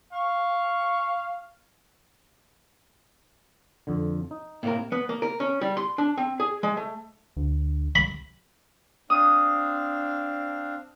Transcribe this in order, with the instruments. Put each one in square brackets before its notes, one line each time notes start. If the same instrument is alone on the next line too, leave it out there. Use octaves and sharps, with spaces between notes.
[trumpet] F5 [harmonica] C#6
[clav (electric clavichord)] F2 D3
D#4
[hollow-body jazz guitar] A2 C3 A#4 [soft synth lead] A#3
[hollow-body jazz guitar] B3
A#3
A#4
C#4
G3
C6
D4
C4
G#4
G#3
A3
[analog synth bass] D2
[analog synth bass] C2 [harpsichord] B5
[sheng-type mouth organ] C4 D4 F5 [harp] D#6